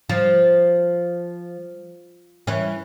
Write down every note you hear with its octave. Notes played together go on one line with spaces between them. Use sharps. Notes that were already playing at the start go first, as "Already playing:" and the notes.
F3
E3 C#4